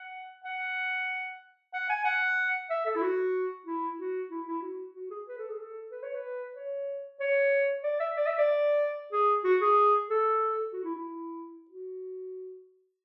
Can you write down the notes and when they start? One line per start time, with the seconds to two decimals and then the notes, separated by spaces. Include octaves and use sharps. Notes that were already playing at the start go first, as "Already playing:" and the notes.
Already playing: F#5
0.44 F#5
1.73 F#5
1.89 G#5
2.05 F#5
2.70 E5
2.86 A4
2.95 E4
3.01 F#4
3.66 E4
3.99 F#4
4.30 E4
4.47 E4
4.62 F#4
4.95 F#4
5.11 G#4
5.28 B4
5.38 A4
5.50 G#4
5.60 A4
5.91 B4
6.03 C#5
6.14 B4
6.55 C#5
7.20 C#5
7.84 D5
8.00 E5
8.17 D5
8.26 E5
8.38 D5
9.12 G#4
9.44 F#4
9.61 G#4
10.10 A4
10.73 F#4
10.84 E4
10.95 E4
11.70 F#4